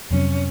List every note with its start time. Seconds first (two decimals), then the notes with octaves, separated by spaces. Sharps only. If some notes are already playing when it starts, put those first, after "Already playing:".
0.10 F2 C3 F#3 C4 C#4